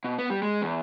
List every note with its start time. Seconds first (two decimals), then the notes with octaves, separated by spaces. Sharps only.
0.04 B2
0.18 B3
0.30 G3
0.42 G#3
0.62 E2